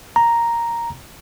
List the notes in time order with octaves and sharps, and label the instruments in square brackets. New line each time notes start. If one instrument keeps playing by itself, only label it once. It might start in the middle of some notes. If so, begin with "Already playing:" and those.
[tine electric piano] A#5